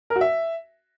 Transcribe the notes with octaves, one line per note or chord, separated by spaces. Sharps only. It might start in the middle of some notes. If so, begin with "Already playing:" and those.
A#4
F#4
E5